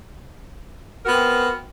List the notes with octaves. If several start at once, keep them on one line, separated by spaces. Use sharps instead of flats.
B3 C4 F#4 A#4